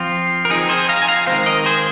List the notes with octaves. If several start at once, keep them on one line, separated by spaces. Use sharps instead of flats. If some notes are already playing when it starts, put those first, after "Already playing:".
Already playing: F3 C4 F4
A#4
F3 C4 D#4 G#4
G#4 C5
F5 A#5
G#5
F5 A#5
D#3 G#3 C4 C5 F5
A#4 D#5
G#4 C5